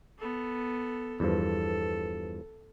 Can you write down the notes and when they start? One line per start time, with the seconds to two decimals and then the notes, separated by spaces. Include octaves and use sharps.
0.19 B3 A4
1.20 E2 G2 F3 A4